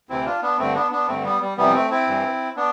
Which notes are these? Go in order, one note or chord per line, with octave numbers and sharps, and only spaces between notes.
D2 C3 E3 C4 E4
D4 F4
B3 D4
G2 D3 A3 C4
B3 D4
B3 D4
G2 D3 A3 C4
G3 B3
G3
F2 C3 E3 G3 B3
A3 C4
C4 E4
G2 E3
B3 D4